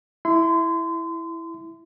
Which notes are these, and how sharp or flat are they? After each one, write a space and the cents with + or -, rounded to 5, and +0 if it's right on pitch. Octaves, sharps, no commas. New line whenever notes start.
E4 +0 C6 -30